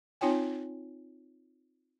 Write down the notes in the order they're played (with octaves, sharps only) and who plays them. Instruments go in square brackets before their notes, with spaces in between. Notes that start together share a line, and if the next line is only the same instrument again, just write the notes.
[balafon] C4 D#4 F4 C#5 G5 G#5